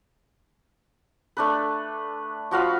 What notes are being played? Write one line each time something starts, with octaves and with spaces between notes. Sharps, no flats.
A3 D4 B4
F3 F#4 F5 B5